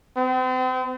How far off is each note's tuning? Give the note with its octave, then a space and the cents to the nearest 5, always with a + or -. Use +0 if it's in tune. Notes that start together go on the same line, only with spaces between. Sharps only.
C4 -35